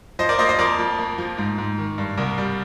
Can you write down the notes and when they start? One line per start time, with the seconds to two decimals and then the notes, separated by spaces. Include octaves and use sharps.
0.19 F3 C5 D#5
0.29 A#4 D5
0.39 A#3 C5 D#5
0.49 C5 D#5
0.58 F2 A#4 D5
0.79 F2
0.98 A#3
1.18 F3
1.38 G#2
1.58 G#2
1.78 D#3
1.98 G2
2.17 C2 A#4
2.38 G3